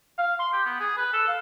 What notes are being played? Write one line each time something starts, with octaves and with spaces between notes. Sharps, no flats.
F5
C6
G4
B3
G#4
B4
A4
F5